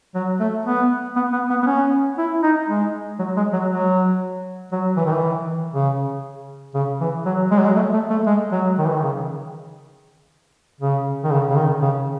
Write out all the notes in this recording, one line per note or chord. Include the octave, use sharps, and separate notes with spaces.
F#3
A3
B3
B3
B3
B3
B3
C#4
E4
D#4
G#3
F#3
G#3
F#3
F#3
F#3
E3
D#3
E3
C#3
C#3
E3
F#3
G#3
F#3
G#3
A3
A3
A3
G#3
F#3
D#3
E3
D#3
C#3
C#3
D#3
C#3
C#3
D#3
C#3